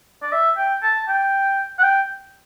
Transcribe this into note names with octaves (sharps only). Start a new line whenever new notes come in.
D5
E5
G5
A5
G5
F#5
G5